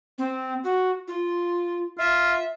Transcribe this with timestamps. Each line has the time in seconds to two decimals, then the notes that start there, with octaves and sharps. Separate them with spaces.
0.18 C4
0.64 F#4
1.08 F4
1.99 F4 E5